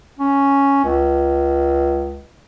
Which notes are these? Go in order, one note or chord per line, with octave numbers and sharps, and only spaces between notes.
C#4
C#2